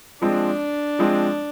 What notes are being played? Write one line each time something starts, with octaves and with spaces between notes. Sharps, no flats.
F3 G#3 C4 D4
F3 G#3 C4